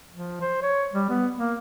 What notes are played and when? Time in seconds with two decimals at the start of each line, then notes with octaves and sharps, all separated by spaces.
0.12 F3
0.41 C5
0.63 C#5
0.93 G3
1.09 B3
1.38 A#3